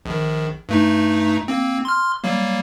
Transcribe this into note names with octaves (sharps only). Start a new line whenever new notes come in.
A#1 D#3
G2 A3 D#4
A#3 C4
C6 F6
F#3 G3 A#3